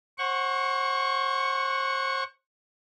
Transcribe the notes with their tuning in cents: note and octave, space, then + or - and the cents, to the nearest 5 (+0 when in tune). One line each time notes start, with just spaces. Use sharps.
C5 +35 F#5 +0 C#6 +0